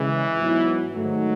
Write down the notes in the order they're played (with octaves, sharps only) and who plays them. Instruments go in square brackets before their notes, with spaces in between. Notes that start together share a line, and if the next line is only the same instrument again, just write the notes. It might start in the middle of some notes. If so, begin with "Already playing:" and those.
Already playing: [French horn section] C#3 G#3 [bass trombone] E3
[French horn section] G#2 F#3 B3 E4
[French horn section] G#2 D#3 A3 [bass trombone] F#3